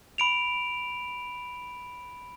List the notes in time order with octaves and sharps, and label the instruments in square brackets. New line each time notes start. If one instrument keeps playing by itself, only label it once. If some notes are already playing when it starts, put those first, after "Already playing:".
[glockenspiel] B5 D7 F7